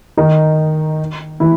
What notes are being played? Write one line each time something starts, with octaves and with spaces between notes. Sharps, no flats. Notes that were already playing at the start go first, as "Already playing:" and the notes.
D#3 D#4
E3 E4